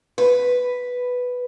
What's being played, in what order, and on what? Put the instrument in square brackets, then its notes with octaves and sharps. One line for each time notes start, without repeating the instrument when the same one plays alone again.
[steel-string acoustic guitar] B4